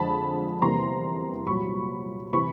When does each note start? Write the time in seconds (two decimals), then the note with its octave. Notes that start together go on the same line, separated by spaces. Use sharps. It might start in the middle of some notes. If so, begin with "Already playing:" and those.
Already playing: F2 D3 F3 G#3 A5 B5
0.62 E2 C3 E3 G3 A#3 A#5 C6
1.47 C2 A#2 F#3 B5 C#6
2.33 C3 E3 B5 C#6